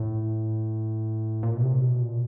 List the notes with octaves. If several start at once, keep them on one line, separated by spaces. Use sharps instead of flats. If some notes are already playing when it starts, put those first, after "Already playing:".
Already playing: A2
A#2
B2
C3
B2
A#2